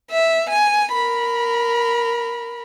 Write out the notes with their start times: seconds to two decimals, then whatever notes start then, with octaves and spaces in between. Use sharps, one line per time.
0.11 E5
0.50 G#5
0.92 A#4 B5